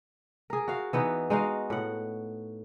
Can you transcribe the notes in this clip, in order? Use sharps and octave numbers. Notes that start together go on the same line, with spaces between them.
G#4 A#4
F#4 F5
E3 B3 D#4
G#3 D#4 F#4 F5
A2 F#5